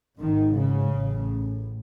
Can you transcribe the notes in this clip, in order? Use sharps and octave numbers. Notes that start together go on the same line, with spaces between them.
G#1 G#2 D#3
C#3
A1 A2